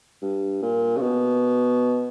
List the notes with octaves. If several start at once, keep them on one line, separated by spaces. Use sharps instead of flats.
G2
A#2
C#3
B2